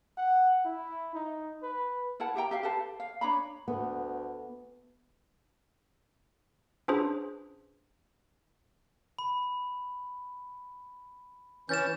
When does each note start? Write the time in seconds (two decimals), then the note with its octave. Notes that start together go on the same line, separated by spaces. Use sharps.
0.18 F#5
0.65 E4
1.15 D#4
1.63 B4
2.20 E4 A#4 F#5 A5
2.36 G4 E5 G5 A#5
2.51 G4 E5 F5
2.63 G4 A4 B4 A5
3.00 F5
3.21 D4 C#5 A#5 B5
3.68 D2 B3
6.88 C#4 D4 F4 G#4 B4 C5
9.19 B5
11.69 E3 C#4 G6 A6 E7